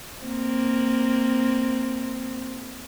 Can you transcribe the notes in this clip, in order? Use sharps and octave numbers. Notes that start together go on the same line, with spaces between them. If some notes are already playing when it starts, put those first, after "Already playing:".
A#3 C4